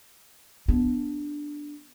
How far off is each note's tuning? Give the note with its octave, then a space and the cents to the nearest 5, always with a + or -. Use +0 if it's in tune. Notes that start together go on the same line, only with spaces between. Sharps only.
B3 +0 D4 +0